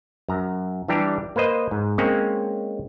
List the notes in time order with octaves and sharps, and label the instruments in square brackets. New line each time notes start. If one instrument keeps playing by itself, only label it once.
[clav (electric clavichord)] F#2 A#5
E3 G3 D4 G4 A#5
A#3 B4 C5 D#5
G#2
G#3 A#3 C4 C#4 C#5